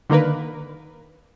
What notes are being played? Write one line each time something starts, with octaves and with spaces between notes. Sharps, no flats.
D3 D#3 A#3 A#4 B4